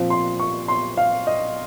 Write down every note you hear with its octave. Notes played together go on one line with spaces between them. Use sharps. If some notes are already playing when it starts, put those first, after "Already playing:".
Already playing: A#2 F3 C4
C6
C#6
C6
F5
D#5